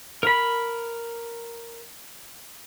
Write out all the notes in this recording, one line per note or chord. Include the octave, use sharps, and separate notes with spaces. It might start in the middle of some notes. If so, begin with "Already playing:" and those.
A#4 B5